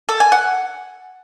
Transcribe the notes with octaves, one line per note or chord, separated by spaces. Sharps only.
A4
G#5
F#5